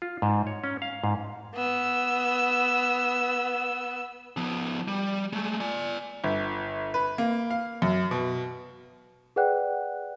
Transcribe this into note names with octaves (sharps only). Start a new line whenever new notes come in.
F4
G#2
C#5
C#4
F5
G#2
B3 E6
F3 B3
G3
G#3 A3
D5 G#5
G1
B4
A#3
F5
F#2
B2
G#4 B4 D5 F#5 G5 F#6